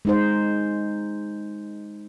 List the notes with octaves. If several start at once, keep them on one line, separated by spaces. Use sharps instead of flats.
G#3 D#4 C5